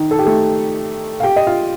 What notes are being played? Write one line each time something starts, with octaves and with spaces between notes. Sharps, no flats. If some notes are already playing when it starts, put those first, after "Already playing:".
Already playing: D#3 D#4
A4
G4
A3 A4
F5
G4 G5
D#5
F4 F5